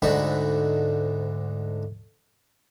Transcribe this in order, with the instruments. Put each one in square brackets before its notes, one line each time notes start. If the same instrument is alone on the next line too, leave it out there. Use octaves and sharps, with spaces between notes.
[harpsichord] D2 G#2 D3 D#4 F#4 B5